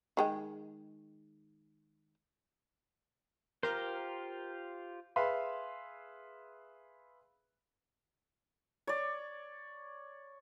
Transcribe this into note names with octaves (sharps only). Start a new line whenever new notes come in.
D#3 G#3 G5
F4 G4 A#4 C5
G#4 B4 E5 F5 B5 C6
C#5 D5